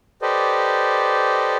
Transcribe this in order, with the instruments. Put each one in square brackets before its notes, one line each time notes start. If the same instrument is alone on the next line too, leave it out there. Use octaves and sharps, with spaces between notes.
[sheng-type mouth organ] G4 A4 B4 C5 D5 D#5